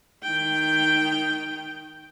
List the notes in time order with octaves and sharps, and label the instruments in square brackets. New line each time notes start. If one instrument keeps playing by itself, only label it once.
[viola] D#3 G5